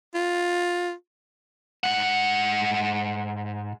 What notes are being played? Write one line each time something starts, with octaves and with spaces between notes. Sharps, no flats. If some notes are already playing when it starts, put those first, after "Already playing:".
F4
G#2 F#5